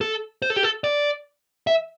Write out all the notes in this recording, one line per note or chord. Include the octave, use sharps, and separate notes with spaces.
A4
C5
A4
G4
A4
D5
E5